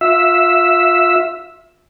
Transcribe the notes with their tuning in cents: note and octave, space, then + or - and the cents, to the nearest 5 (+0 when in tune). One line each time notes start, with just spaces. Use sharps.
F4 +25 E5 +0